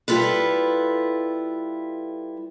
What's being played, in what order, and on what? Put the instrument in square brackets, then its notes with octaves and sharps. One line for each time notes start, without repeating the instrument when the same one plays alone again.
[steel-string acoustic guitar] G3 E4 F4 A4 B4